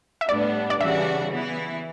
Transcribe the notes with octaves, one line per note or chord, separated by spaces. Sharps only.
E5
A2 G3 B3 D4 D5
D5
C#3 E3 G3 D4 F#4 E5
E3 B3 E4